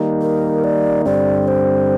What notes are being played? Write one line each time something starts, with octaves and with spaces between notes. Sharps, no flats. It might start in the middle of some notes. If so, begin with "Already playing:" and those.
Already playing: D#3 G3 A#3 D#4
A#4
D5
G2 D3 G3 C4 D5
C5